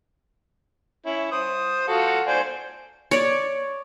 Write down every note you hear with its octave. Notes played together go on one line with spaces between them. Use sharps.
C#4 E4
C5 D#6
F4 F#4 A4
C5 D5 G#5
C#5 D5